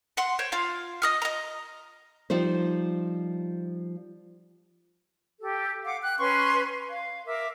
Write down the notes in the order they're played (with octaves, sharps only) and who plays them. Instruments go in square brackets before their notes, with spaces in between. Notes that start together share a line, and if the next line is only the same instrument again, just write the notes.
[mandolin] F#5 C6
C5 C#5 G5
F4 F5
D#5 D#6 F6
D#5 A#5
[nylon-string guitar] F3 G3 D#4 C5
[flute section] G4 A4
F5 F#5 D6
G5 F#6
C#4 B4 C6 C#6
F5
A#4 E5 D6